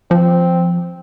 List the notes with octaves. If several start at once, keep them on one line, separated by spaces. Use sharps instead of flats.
F3 C4